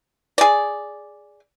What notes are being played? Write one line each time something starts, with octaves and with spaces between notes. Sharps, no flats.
G#4 D5